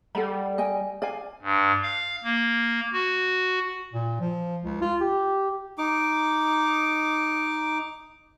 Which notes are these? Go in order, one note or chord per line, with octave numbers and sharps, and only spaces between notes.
G3 A4 F#5 B5
D#5 G5 G#5
D5 F5 G#5
G2
F5
A#3
F#4
A#2
F3
C#2
F4
G4
D#4 D6